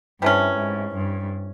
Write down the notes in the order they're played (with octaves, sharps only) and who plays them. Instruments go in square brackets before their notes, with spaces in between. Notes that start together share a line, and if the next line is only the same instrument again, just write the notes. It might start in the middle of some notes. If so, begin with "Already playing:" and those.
[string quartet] G2 [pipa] C3 E3 A3 C#4
[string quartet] G#2
G2